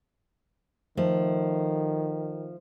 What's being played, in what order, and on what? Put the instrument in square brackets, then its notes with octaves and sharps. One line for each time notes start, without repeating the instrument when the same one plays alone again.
[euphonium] D#3 [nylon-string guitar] F3 A3